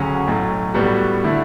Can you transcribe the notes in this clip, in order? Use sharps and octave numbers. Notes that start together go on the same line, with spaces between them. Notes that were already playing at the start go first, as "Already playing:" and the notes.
Already playing: D2 C#3 F#3 C#4
B1 A2 F#3
A2 G3 B3 F#4
D3 A3 E4